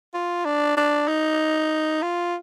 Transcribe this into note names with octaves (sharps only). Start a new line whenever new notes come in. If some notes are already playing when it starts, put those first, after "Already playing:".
F4
D4
D4
D#4
F4